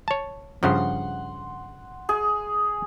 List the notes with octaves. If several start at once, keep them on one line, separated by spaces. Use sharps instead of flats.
C#5 A5
G2 C#3 F3 F#5 C6
G#4